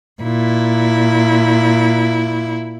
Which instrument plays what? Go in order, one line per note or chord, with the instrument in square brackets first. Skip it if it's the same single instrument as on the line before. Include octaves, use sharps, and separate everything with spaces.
[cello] A#2 E4